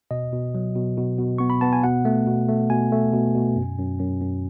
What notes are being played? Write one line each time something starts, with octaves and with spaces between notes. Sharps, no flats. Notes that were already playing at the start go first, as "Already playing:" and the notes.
B2 D#5
B2
F#3
B2
B2
B2
B3 C#6
B5
B3 A5
G#5
B2 F#5
A3
B2
A3
B2 G#5
A3
B2
B2
F#2
F#2
F#2
F#2